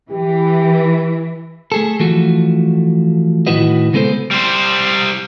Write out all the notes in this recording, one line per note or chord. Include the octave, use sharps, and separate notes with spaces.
E3 G4
A3 G#4 A4
E3 F3 A3 F#4
A2 D#3 E4 F#4 B4 D#5
C#3 G#3 B3 A4 C5
G3 C5